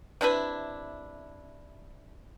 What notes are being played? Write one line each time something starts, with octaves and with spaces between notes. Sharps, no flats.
C3 D4 E4 B4